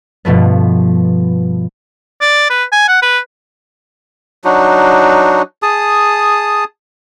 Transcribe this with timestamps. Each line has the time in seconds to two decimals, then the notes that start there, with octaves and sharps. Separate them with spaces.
0.25 G2 B2 F3 A3 B3
2.21 D5
2.50 B4
2.72 G#5
2.88 F#5
3.02 B4
4.44 F#3 D4 D#4 F#4
5.63 G#4 A5 D#6